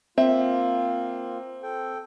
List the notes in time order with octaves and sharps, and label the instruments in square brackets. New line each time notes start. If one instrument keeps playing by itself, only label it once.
[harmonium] A#3 F4 [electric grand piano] C4 [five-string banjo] E5
[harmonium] A4 G5